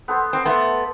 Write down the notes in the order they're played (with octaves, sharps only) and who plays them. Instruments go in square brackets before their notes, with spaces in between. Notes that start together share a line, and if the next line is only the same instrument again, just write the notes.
[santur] B3 A4 C5
[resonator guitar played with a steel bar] C4
[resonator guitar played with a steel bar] A3 B3 [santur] C6